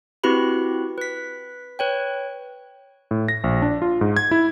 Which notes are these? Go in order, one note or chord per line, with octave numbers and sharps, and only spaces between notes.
C4 E4 F#4 G4 B4 B5
B4 B6
B4 C#5 G5
A2
A#6
A#1
D4
F4
G#2
G#6
E4